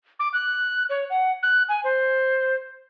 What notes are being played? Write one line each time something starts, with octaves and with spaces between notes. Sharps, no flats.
D6
F#6
C#5
F#5
F#6
G#5
C5